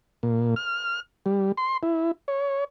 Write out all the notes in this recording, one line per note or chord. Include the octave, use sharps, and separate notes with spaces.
A#2
F6
G3
C6
E4
C#5